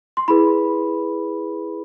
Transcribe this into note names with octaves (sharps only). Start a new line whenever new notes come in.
C6
E4 G#4 B4 B5